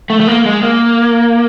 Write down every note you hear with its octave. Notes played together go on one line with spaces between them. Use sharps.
A3
A3
A#3
G#3
A#3